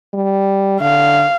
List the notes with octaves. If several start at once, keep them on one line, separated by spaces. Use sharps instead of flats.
G3
D3 F5